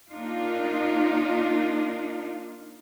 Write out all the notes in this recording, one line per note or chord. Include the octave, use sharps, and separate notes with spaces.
A#3 D4 D#4 F4